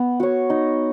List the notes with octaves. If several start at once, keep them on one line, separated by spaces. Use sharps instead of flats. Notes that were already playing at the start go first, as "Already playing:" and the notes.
Already playing: B3
F#4 C#5
D#4